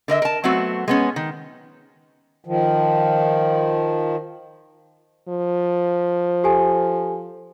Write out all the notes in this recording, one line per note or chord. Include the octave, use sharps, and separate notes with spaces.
D3 A#4 D#5 E5
A#4 A5
F#3 A3 B3 C4 F#4
G#3 B3 C#4
D#3
D#3 F3
F3
G4 A4 G#5